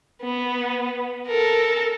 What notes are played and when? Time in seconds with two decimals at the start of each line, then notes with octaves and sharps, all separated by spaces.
0.22 B3
1.27 A4 A#4